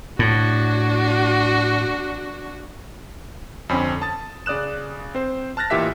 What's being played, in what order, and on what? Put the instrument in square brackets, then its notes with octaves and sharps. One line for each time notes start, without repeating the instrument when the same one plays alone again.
[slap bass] A2 [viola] D4 F#4
[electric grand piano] F2 D3 C4 C#4 G#5 B5
A5 D#6 A6
C#3 D5 D#6 F#6 E7
C4 C5
A5 F6 F#6 A6 A#6
A1 A#2 E3 G4 E5 B6